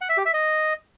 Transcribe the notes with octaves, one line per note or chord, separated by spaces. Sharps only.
F#5
E5
G4
E5
D#5